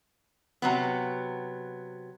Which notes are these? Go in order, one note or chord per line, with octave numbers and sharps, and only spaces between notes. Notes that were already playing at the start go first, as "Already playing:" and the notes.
C3 F#3 B3